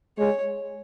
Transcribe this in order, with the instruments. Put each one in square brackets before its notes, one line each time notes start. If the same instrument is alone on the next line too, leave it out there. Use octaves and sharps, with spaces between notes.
[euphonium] G#3 [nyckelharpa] C#5